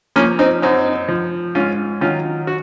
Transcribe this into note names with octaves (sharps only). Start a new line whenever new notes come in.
F3 A#3 C#4
C4 D#4
F#2 C4 D#4
F3
G#2 C#4 F4
D#3 F#3 C#4 F4
F#4